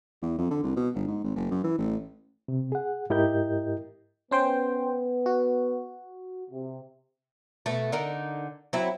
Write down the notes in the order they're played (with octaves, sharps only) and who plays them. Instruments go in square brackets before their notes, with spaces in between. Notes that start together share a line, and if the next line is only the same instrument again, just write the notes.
[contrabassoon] E2
F2
D3
C2
B2
G1
G#2
G#1
F#1
F#2
E3
A1
[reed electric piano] C3
G#4 F#5
G#2 E4 G4 A#4 D#5 G6
[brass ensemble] B3 B4 [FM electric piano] C#4 C5 G5
[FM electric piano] F#4
[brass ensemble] C3
[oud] B2 A3
D3 D#4 A#4
F#3 C4 E4